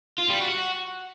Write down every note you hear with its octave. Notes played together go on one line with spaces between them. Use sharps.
F4
G3
F#4